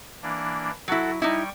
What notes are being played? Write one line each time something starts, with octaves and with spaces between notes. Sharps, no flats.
E3 A#3 D4
F#3 E4 F#4 A4 F#5
G3 D#4 E4 G5 C#6